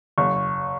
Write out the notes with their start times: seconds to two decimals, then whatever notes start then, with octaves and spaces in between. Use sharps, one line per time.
0.18 F#1 C#6